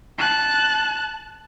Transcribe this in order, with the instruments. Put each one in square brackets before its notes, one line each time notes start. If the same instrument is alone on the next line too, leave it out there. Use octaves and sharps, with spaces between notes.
[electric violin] A5 F#6